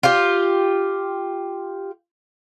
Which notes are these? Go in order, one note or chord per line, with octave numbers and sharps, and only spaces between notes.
F4 G4